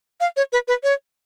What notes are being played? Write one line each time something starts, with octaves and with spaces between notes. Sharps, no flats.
F5
C#5
B4
B4
C#5